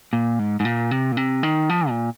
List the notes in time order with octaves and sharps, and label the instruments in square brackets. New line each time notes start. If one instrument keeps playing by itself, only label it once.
[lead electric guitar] A#2
G#2
G#2
A#2
C3
A#2
C3
D#3
F3
A#2